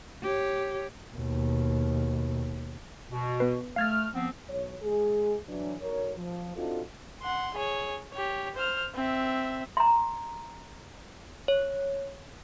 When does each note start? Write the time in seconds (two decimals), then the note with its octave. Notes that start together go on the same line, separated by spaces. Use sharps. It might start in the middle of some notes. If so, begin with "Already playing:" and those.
0.23 G4 C#5
1.15 D#2 B2
3.11 B2
3.40 B3 B4
3.76 A3 F5 F6 G#6 A6
4.14 F3 B3 C4
4.50 B1 C#5
4.83 G#3 G#4
5.48 E3 F#3 D4
5.81 B1 A#4 C#5
6.17 F3
6.56 C4 D4 D#4 F4 F#4 A4
7.23 F#5 C6
7.55 G#4 C#5
8.13 G4 C#5
8.55 C5 F6
8.95 C4 E5
9.77 A#5 C6
11.48 C#5